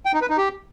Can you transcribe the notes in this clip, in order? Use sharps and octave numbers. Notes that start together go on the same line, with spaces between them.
G5
D#4
B4
D#4
G4